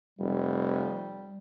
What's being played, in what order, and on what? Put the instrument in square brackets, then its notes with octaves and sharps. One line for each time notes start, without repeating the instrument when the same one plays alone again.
[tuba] F1 [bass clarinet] G3